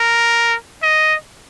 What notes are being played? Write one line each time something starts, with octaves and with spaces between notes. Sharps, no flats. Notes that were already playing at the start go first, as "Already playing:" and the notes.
Already playing: A#4
D#5